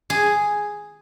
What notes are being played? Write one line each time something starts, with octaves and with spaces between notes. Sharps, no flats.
G#4